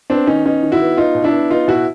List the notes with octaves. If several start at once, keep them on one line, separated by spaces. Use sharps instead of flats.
B3 C4 D4
D#3 C#4 D#4
B3 C#4 D#4
D#3
E4 F#4
B3
B3 D#4 F4
B2
D4 E4
B3
B3 D#4 F4
B2 E4 F#4